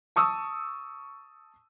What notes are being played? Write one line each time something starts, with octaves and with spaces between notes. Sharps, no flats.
A5 C#6 D#6 E6